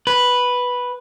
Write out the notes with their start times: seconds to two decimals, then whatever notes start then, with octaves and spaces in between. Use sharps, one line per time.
0.07 B4